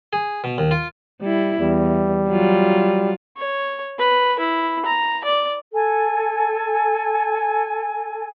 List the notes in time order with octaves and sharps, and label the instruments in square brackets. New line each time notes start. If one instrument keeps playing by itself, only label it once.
[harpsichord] G#4
B2
D#2
F4
[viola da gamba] G3 E4
[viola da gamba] E2 [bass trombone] G3
[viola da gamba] F#3 F4
[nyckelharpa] C#5
B4
E4
A#5
D5
[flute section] A4 G#5